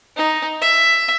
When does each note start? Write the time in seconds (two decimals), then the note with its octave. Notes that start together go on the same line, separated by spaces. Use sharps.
0.17 D#4
0.61 E5